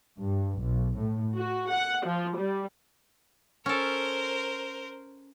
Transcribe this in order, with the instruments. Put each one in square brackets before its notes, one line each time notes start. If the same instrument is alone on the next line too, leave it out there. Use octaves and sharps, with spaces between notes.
[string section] G2
B1
A2
F#4
F#5
F3
G3
[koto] C#4 A4 [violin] A#4 C5